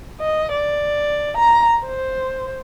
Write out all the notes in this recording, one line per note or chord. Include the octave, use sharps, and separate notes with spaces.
D#5
D5
A#5
C5